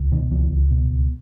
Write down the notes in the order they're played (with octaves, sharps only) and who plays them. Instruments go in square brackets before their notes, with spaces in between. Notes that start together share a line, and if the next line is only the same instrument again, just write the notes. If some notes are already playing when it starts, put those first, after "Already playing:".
Already playing: [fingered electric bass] C#2
B2 D#3
C#2 E3
C#2
B2
C#2